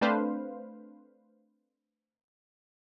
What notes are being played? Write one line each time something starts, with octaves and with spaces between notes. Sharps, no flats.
A3 C4 D4 B4 C5 F5